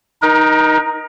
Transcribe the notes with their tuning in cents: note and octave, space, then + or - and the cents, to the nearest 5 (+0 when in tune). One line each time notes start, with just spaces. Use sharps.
D#4 +0 A#4 +35